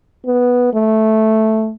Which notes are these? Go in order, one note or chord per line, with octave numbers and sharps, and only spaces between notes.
B3
A3